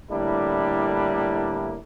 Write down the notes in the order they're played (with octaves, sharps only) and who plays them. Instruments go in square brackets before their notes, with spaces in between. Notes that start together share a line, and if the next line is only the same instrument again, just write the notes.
[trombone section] A2 D3 G3 A#3 D4 E4